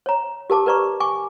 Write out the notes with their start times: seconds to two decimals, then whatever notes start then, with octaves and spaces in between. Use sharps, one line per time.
0.06 C#5 A#5
0.50 G4 A#4 A5 D6
0.66 A#4 B4 D5 A#5 C#6
1.00 G#5 C#6 D6